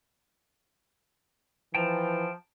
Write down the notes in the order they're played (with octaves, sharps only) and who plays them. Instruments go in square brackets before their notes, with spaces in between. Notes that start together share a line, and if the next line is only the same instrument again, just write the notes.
[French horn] E3 [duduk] F3 [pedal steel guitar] G5 A5 A#5